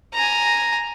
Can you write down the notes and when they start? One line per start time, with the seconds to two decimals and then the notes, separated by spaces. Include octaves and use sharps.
0.13 G#5 A#5